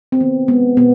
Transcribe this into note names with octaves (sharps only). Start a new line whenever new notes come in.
C4
D#3 B3
G#3 B3
B2 B3